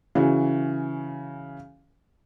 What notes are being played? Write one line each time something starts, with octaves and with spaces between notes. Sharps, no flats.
C#3 E3 F#4